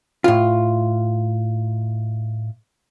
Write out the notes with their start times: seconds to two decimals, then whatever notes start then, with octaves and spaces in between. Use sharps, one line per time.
0.24 A2 F4